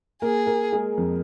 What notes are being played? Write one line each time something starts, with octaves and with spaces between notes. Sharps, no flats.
A#3 G#4 A#4
A#3 A#4
G#3 G#4
F2 F3